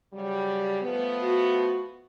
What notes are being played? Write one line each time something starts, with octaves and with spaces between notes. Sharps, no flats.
C#3 F#3 G3
F3 A3 B3
F#4